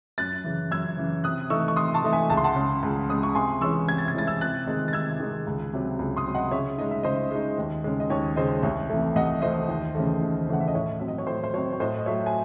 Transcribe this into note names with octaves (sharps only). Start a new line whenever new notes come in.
F#2 F#6 A6
C#3 E3
F#2 E6 G#6
C#3 E3
C3 D#6 F#6
E3 A3 D#4 C#6 E6
C#6
C3 C6 D#6
A5 C#6
E3 A3 D#4
E5 G#5
C#2 A5
C6
F#5 A5
C#3 G#3
C#2
C#3 G#3 D#6
C#6
C3 G#5 C6
E3 G#3 C#4 E4 C#6 E6
C3 G#6
A6
G#6
E3 G#3 C#4 E4 A6
E6 G#6
C3 F#6 A6
D#3 G#3 C4 D#4
A6
C3 E6 G#6
D#3 G#3 C4 D#4
C#2
C3 F#3
C#2
C6 D#6
C3 F#3
D#5 F#5
C#3 C#5 E5
G#3 D#4 D#5
E5
C#3 C5 D#5
G#3 D#4
D#2
C#3 G#3
D#5
D#2 C#5
C#3 G#3 C5 D#5
C2 C#5
C3 E3 A3
C2 D#5 F#5
C3 E3 A3 C5 D#5
D#2
C#3 E3 A3
D#2
C#3 E3 A3 F#5
E5
D#5
A2 C#5
F#3 C4 E5
D#5
C#5
A2 C5
C5
F#3 C4 C#5
C#5
A2 C5 D#5
D#5
F#3 A3 C#5 E5
G#5